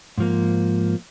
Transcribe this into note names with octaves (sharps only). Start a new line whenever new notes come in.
G#2 F3 A#3